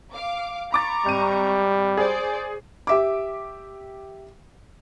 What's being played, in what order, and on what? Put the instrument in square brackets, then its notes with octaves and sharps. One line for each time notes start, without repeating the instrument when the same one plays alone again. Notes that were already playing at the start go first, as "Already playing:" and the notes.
[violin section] F5 D6
[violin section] A#5 C#6 [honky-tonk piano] B5 D6 A6
[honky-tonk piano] G#1 D#7 [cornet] G3
[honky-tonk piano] G#4 [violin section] C5 D5
[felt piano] G4 E5 D6